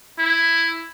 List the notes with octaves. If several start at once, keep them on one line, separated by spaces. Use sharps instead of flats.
E4